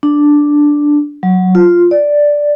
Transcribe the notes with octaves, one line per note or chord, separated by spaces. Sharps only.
D4
F#3
F4
D5